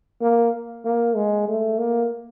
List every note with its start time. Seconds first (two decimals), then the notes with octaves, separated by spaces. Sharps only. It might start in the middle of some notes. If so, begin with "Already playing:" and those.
0.22 A#3
0.85 A#3
1.15 G#3
1.48 A3
1.78 A#3